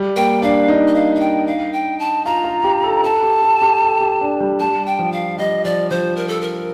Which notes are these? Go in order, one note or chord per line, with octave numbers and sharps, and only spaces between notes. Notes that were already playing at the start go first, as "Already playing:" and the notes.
Already playing: G3
A#3 G5
D4 F5
D#4
D#5
F5
F5
G5
F5
G5
A5
F4 A#5
F4
G4
A4
A4 A5
G4
A4
G4
A4
G4
D4
G3
G3 A5
G5
F3
F5
G3 D#5
F3 D5
F3 C5
A#4
A4
A#4